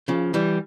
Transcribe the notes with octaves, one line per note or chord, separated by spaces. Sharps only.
C#3 F3
E3 G3